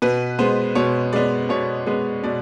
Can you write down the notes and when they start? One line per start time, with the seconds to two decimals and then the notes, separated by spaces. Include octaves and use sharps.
0.02 B2 B4
0.39 G#3 B3 C5
0.75 B2 C#5
1.13 G#3 B3 D5
1.49 B2 C#5
1.87 G#3 B3
2.24 B2 D5